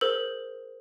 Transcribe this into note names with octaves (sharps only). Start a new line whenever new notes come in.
G#4 A#4 C5 E6 F#7